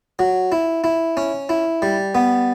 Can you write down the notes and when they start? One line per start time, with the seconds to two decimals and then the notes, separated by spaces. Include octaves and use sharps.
0.19 F#3
0.52 E4
0.84 E4
1.17 C#4
1.49 E4
1.82 G3
2.15 B3